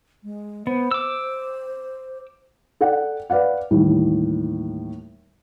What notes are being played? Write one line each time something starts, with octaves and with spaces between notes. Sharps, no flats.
G#3
B3 C5
D6 E6
A4 D5 F#5 G5
B4 D5 F5 F#5
D#2 A2 E3 G3